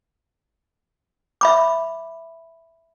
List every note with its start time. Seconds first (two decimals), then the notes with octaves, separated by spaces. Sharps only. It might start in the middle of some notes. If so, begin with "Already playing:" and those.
1.41 E5 B5 D6